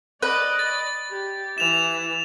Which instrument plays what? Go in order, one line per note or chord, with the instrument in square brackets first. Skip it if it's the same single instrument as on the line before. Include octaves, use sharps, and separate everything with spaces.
[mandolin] B4 [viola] D5 D#5
[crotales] A6
[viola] G4
[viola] E3 [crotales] E7 F7